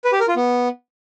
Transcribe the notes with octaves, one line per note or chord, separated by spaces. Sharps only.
B4
G4
A#4
F4
B3